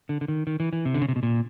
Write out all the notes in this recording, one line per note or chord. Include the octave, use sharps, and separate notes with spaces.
D3
D3
D#3
D#3
E3
E3
C3
D3
C#3
C3
B2
A#2